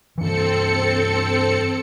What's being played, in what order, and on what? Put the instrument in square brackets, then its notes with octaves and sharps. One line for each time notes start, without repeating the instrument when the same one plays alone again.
[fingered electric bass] G2 E3 [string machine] C4 A4 C#7